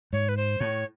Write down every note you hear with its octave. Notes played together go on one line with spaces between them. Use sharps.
G#2 C#5
B4
C5
A2 C#5